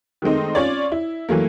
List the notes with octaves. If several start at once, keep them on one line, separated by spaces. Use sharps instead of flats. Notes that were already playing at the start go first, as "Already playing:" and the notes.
D#3 G#3 A3 C4 D#4
C#4 F4 C#5 D5
E4
E3 F#3 A3 A#3